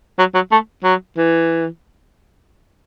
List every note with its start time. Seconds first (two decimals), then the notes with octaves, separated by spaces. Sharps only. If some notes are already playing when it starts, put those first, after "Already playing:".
0.19 F#3
0.34 F#3
0.52 A3
0.84 F#3
1.17 E3